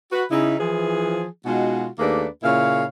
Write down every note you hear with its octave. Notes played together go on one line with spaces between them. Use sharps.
F#4 B4
C#3 D#4 E4
E3 F3 G#4
B2 G#3 D#4 F4 F#4
D#2 A3 A#3 D4 G#4 B4
A#2 C#3 E4 C#5 F5